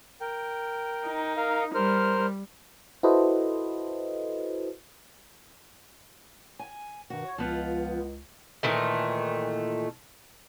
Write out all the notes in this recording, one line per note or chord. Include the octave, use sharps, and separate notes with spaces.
A#4 G5
D#4
A#4 F5
G3 A#4 C5 F6
E4 F#4 A4 B4 C5 D#5
G#5
G2 B2 D#3 F#4
C#5
C#2 F3 B3 F4
A#2 D#3 E3 A3